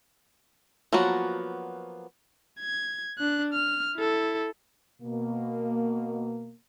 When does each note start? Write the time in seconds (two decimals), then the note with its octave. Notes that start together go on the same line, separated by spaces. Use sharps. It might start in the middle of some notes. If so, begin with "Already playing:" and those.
0.93 F3 F#3 A#3 B3 F#4
2.60 G#6
3.19 D4 F#6
3.53 F6
3.95 E4 A4
5.02 B2 A#3